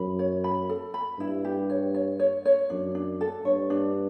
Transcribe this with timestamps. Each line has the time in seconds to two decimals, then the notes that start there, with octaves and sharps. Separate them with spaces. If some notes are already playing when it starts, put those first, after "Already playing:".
Already playing: F#2 B5
0.19 C#5
0.44 B5
0.69 A4
0.94 B5
1.19 G2 E4
1.44 G4
1.70 C#5
1.94 C#5
2.19 C#5
2.45 C#5
2.70 F#2 D4
2.95 D4
3.21 A4
3.45 G2 C#5
3.70 D4